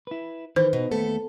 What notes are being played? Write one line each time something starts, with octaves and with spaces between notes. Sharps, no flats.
E4 B4
D#3 E3 C5
B2 D#4
D#2 A3 B3 A4